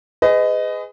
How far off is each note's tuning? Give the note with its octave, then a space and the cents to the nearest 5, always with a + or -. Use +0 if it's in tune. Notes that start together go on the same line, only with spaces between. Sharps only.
G#4 +0 B4 +40 D#5 +0